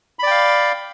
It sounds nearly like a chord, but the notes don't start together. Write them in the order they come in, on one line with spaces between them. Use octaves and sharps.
B5 D5 G5 F5